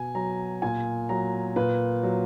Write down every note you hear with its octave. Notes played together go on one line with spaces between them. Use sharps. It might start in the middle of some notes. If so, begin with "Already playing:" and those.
Already playing: B2 G#5
F#3 A#5
A#2 G#5
F#3 A#5
A#2 B4
F#3